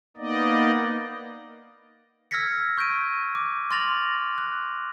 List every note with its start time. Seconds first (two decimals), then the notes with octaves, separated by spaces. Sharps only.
0.17 A#3 B3 D#4 D5 D#5
2.31 E6 F6 G#6 A#6 B6 C#7
2.77 C#6 G6 A#6 D7 D#7
3.35 D6
3.71 C6 F6 A6 A#6 F7 F#7
4.38 F#6